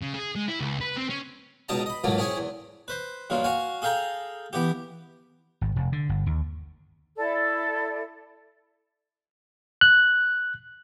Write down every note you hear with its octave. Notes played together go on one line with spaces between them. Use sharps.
C#3
G#4
G#3
E4
C#2
B4
C4
C#4
C#2 B2 D#4 D#5 A5 A#5
D#5 B5
C#2 G#2 E3 F#3 A3 A#3
C4 C#4 E4 G#4 C#5
E2
B4 C5
A#1 G2 F#3 F4
F#4 F5 G#5
G#4 A4 F5 G5 A#5
E3 B3 G4
G#1
F1
D3
G1
D#2
E4 A4 D5
F#6